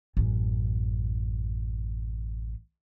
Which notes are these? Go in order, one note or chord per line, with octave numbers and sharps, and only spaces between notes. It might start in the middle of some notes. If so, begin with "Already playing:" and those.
A1 F#2